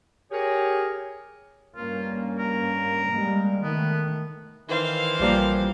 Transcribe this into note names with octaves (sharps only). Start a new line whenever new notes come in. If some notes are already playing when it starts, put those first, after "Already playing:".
G4 G#4 A#4 C#5
G2 A#3 C#4 F4
A#4
G3 G#3 A#3
D#3 A3 B3
D#3 E3 C5 F5
A#1 F3 G3 A#3